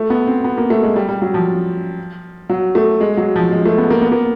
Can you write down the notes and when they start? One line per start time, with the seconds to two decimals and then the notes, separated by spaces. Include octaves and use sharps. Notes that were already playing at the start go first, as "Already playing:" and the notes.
Already playing: A3
0.10 B3
0.27 C4
0.44 B3
0.58 A#3
0.70 A3
0.83 G#3
0.96 G3
1.08 G3
1.22 F#3
1.34 F3
2.49 F#3
2.75 A3
3.01 G#3
3.17 F#3
3.36 F3
3.52 G#3
3.65 A3
3.78 B3
3.90 A#3
4.02 B3
4.12 A#3